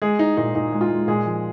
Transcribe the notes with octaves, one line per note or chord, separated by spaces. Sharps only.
G#3 G#4
G#3 D#4
A#2 D#4
A#2 D#4
G#3
F4
G#3
A#2 G#3 G#4
F3